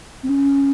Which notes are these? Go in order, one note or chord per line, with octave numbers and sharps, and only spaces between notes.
C4
C#4